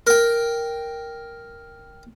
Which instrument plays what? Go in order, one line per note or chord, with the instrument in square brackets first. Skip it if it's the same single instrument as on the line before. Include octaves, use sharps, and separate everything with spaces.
[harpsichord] A#4 G5